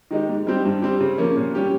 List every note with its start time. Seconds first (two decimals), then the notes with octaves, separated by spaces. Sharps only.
0.11 D#3 G#3 D#4 G4
0.29 G#2
0.47 G3 C4 G4
0.65 G2
0.82 G3 C4 G4
1.01 C#3
1.18 F3 A#3 C#4
1.36 A#2
1.55 G3 C#4 G4